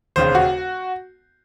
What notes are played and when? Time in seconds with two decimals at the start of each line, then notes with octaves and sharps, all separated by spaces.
0.16 E1 D#2 C#3 C5
0.35 F#4